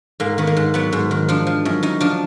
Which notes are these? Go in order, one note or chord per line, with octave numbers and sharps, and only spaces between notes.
G#2 A#3
D#3 B3
A#3
G#2
F#3 B3
G#2
D#3
F3 D4
F3
F#2
F#2 D#4
F3 D4